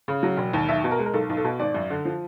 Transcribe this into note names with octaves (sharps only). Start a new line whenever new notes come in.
C#3
F#3
E1
D#2
B1 E5
B2
A#4
G#3
A#4
B1 A4
B1
A4
B2
G#1 D5
F#2
D3
F3